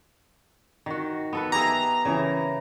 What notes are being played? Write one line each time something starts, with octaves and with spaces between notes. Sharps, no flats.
D#3 F#4
B3 A4 B4
G4 G#4 E5 A#5
C#3 E3 A#4